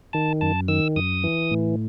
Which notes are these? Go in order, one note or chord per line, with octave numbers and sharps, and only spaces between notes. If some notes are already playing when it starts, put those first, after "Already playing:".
D#3 A5
F#2 A5
D#3 E6
F#2 D#6
E3
A2